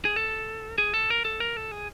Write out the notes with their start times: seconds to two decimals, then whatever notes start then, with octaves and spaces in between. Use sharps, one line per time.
0.05 G#4
0.16 A4
0.78 G#4
0.94 A4
1.10 A#4
1.25 A4
1.40 A#4
1.57 A4
1.72 G#4